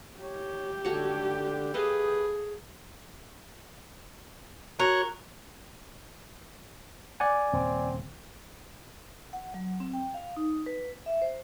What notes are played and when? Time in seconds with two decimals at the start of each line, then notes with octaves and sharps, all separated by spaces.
0.20 G4 C#5
0.85 D3 A3 F#4 C#5
1.74 G#4 A4 B4 D#5 F5
4.79 F#4 A#4 C#5 C#6 F#6
7.20 D5 F#5 G#5
7.53 D#1 C#3 C4
9.33 F#5
9.54 F#3
9.80 C4
9.94 G5
10.14 F5
10.37 D#4
10.66 B4
11.06 E5
11.22 C5